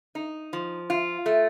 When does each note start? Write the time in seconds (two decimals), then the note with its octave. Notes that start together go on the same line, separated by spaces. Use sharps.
0.15 D#4
0.53 F3
0.90 F4
1.26 A3